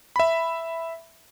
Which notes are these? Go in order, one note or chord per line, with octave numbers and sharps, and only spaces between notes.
E5 B5